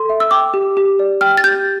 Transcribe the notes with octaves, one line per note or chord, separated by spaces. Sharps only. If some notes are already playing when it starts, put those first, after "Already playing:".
Already playing: A4 C6
E5
E6
G5 D6
G4
G4
D5
G5 F6
A6
G4 G6